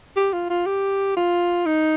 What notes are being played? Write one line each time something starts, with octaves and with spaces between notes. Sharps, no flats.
G4
F4
F4
G4
F4
D#4